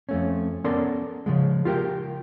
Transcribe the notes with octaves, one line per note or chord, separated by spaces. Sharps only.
F2 A3 C#4
B3 C#4 A4 A#4 D5 C6
C#3 F3 G#3
F4 G4 A#4 G5